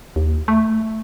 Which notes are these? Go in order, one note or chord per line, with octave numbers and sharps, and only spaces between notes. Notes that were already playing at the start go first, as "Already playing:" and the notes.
D#2
A3